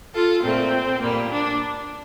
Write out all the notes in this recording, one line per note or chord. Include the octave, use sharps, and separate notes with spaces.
F4 A4
A#2 A3 C4
A#2 G3 A#3
D4